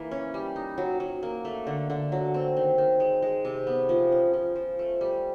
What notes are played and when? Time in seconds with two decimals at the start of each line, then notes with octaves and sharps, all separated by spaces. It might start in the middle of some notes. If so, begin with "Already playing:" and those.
Already playing: E3 A#3
0.11 C#4
0.34 G3
0.56 D#4
0.78 F#3
1.00 F#3
1.23 A#3
1.45 A3
1.67 D3
1.90 D3
2.12 F#3
2.34 C4
2.57 D#3
2.78 D#3
3.00 G#3
3.22 G#3
3.45 C3
3.67 B3
3.89 F3
4.12 C#4
4.34 F3
4.56 F3
4.79 A3
5.01 G3